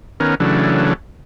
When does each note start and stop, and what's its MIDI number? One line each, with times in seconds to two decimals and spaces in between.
0.20 0.35 51
0.20 0.35 59
0.20 0.35 61
0.20 0.35 70
0.40 0.93 49
0.40 0.93 52
0.40 0.93 54
0.40 0.93 57
0.40 0.93 62